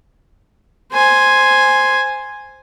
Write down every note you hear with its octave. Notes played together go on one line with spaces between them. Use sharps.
C5 G#5